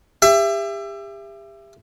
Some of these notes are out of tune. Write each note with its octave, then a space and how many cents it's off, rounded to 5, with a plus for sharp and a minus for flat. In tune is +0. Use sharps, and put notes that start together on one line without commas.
G4 +35 E5 +25